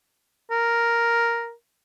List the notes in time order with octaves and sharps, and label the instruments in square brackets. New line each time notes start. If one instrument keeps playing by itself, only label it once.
[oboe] A#4